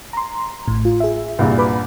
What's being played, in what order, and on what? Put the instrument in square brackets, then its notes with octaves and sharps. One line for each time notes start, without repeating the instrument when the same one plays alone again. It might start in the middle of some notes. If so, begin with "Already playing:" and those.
[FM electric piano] A#5 C6
A1 A2
F4
G#4 E5
[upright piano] C2 G2 A#2
[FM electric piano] B4 B5 D6